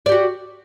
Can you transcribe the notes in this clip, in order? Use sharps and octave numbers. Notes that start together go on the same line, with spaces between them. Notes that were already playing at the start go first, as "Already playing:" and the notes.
F#4 G4 D5